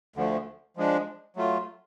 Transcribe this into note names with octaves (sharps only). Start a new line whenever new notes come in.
D2 D3 F3 A3
F3 G#3 D4
F#3 A3 F4